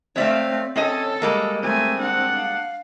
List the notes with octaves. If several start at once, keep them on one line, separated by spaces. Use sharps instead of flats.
A3 C4 C#5 D5 E5 F5
C4 C#4 A4 C#5 D#5
G3 G#3 A#3 D#5
A3 C4 G#5
D4 F#5
F5